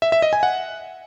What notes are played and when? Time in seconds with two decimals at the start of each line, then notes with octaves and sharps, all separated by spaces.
0.02 E5
0.12 E5
0.22 D#5
0.33 G#5
0.43 F#5